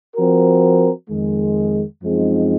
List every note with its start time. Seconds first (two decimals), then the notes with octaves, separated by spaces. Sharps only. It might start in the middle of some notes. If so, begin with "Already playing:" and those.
0.16 F3 C4 F#4 A#4
1.10 F2 D#3 G#3
2.03 F#2 F3 G#3 C4 D#4